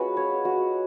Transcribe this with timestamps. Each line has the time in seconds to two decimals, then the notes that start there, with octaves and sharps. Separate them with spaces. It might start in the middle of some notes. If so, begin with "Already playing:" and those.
Already playing: G#3 C#4 F4 F#4 B4
0.17 C#5
0.45 F#4